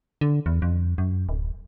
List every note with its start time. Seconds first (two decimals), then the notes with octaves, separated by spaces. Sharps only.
0.21 D3
0.46 E2
0.62 F2
0.98 F#2
1.29 D1